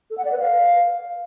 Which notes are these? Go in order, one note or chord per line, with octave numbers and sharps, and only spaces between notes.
A4
F#5
D5
B4
F5